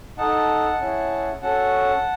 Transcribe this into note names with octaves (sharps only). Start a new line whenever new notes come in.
D#4 A4 F#5 A5
C#4 E4 G#4
C#4 F#4 A4 F#5 A5